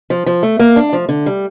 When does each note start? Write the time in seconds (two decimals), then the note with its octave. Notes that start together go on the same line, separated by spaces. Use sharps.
0.10 F3
0.26 F3
0.43 A3
0.59 A#3
0.76 D4
0.93 F3
1.09 D3
1.26 G3